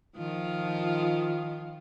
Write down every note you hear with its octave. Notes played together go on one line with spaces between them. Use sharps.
D#3 F3 F4